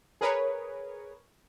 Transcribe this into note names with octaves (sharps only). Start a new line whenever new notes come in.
G#4 A#4 B4 C#5